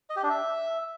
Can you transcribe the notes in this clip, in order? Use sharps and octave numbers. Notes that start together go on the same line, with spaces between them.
D#5
G4
D4
E5